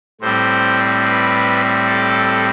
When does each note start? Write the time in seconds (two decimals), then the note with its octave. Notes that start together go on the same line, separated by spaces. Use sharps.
0.21 A2 G3 C4 C5
1.05 B4
1.87 A4